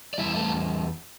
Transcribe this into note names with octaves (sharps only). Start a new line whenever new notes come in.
D5
E2 E3 G3 E4 E5
A3 A4